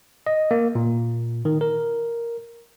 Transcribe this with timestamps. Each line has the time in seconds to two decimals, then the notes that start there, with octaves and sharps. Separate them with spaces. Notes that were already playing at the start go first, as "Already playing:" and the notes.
0.27 D#5
0.51 A#3
0.75 A#2
1.45 D#3
1.61 A#4